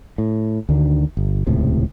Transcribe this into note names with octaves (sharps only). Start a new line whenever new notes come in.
A2
D2 D3 D#3
G1
D#1 C#2 A2 C3